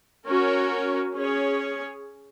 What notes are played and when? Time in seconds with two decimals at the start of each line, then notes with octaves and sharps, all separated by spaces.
0.27 C#4 F#4 A#4 C#5
1.14 C#4 G#4 C#5